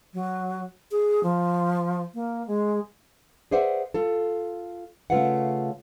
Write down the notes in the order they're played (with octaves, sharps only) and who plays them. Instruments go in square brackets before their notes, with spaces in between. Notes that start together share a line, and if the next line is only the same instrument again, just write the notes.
[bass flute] F#3
G#4
F3
A#3
G#3
[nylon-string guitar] G#4 B4 C5 D5 E5 F#5
F4 A4
C#3 A3 F4 B4 F5 F#5